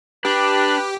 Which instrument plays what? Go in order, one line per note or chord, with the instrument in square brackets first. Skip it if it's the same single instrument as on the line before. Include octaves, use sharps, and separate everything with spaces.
[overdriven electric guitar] D4 [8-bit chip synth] G4 [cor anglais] B4